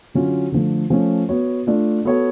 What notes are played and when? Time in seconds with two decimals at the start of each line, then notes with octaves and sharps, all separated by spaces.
0.14 D3 F#3 C#4 F4
0.52 D3 F3 A3
0.90 F3 A3 C#4
1.29 B3 F#4 C#5
1.67 A3 D4 F4
2.05 B3 F#4 A4 C#5